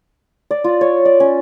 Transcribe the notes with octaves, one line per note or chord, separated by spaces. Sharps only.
D5
F4
C#5
D5
C#4